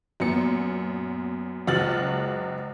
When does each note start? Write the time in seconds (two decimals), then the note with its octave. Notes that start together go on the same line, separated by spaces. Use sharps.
0.20 F#2 A#2 B3 C#7
1.67 F#1 C#2 F#4 F6 A6 F#7